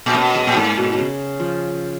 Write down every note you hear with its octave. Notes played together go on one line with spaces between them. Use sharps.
A#2
B2 A#3 C#4
G#3 B3
A#2
G#2 A#3
B2
B2
C#3
F3